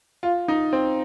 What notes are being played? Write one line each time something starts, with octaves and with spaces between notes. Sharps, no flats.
F4
D#4
C4